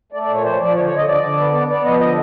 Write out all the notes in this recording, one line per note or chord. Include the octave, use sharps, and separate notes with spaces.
A3 D5
D5
A#2
C#5
F3 C5
F3 D5
D3 C#5
C#5
D3
D#5
D3 D5
D3
B3
B3
B3 D5
F3 D#5
D3 D#5